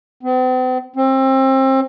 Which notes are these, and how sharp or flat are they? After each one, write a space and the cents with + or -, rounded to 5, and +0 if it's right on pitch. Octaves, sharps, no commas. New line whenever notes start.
C4 -45
C4 +30